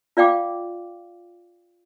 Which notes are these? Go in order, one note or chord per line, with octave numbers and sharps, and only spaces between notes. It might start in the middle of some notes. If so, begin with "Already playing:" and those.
F4 D5 F5 G5 D6